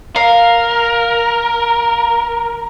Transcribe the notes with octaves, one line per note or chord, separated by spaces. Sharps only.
A#4 F5